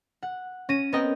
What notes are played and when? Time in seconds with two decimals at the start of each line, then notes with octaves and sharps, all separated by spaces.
0.23 F#5
0.69 C#4 A#6 D#7
0.93 B3 C4 A#4 D#5 G5